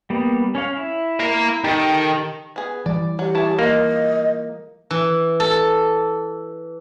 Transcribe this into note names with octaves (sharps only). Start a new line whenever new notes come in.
G3 A#3 B3
C#4 C#5 F5
E4
F5 A#5
D#3 G4 A4
B3 G#4
E3 G3 D5
F#3 G4
E4 G#4 C#5 A5
A#3 F4 D#5 F5
E3
A4